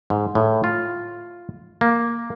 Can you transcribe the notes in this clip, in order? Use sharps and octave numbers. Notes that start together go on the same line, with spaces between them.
G#2
A2
F4
A#3